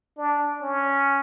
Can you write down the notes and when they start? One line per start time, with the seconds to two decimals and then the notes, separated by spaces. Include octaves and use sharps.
0.17 D4
0.62 C#4